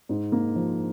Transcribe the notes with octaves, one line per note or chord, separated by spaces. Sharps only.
G#2
A#3
F3